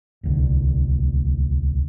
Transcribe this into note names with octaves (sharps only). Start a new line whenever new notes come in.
D1 C2 D3